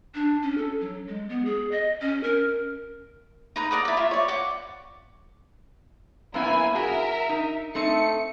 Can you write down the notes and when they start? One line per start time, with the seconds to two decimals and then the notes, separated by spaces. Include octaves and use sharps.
0.15 D4
0.42 C#4
0.58 A4
0.81 F#3
1.08 G#3
1.29 B3
1.45 G#4
1.71 D#5
2.01 C#4
2.23 A#4
3.56 D#4 B4 A#5
3.71 A#4 D5 F#5 D#6
3.85 E4 D5
3.97 F4 E5 C#6
4.11 C#5 D5
4.28 F#5 D6
6.34 F#2 A#3 B3 E4 G#5
6.75 F#4 G#4 A#4 E5
7.29 D#4
7.75 A3 C4 D#4 C#7